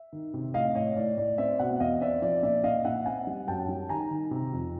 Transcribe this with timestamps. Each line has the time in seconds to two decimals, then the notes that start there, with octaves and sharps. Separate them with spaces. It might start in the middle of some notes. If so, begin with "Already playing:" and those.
Already playing: E5
0.13 D#3
0.34 C3
0.54 A2 D#5 F5
0.75 A2 C#5 D#5
0.96 A2 D5
1.17 A2 D5
1.38 C4 D5 E5
1.59 B2 E5 F#5
1.80 E2 D#5 F5
2.01 C4 D5 E5
2.22 F3 D5
2.43 A#2 D5 E5
2.64 A#2 D#5 F5
2.85 A#2 E5 F#5
3.06 C4 F#5 G#5
3.27 G3
3.47 F#2 G5 A5
3.69 G3
3.89 D#3 G#5 A#5
4.11 D#3
4.31 C3
4.53 F2